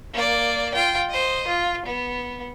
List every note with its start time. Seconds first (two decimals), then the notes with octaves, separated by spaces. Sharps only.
0.13 A#3 D5
0.74 F4 G5
1.09 C5 D#5
1.47 F4
1.85 B3